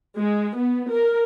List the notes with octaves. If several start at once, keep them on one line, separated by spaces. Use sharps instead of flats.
G#3
B3
A#4